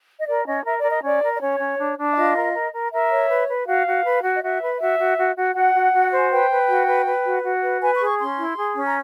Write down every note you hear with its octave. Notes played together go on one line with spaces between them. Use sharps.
D#5
A#4 D5
C#4 D#5
A#4 E5
D5
A#4
D#5
C#4 D5
A#4
D5
C#4 C#5
C#4
D4
D4
E5
F4 D#5
A#4
A#4
A#4
A#4 E5
C#5
B4
B4
F#4 F5
F#4
B4
F#4
D#5
F#4 E5
B4
F#4 E5
F#4
F#4
F#4
F#4 F#5
F#4
F#4
C5
G#5
B4 G5
B4
F#4
B4
B4
F#4
F#4
B4
B4 G#5
C#6
G#4
C#6
C#4 C6
E4
G#4
C#4
A#5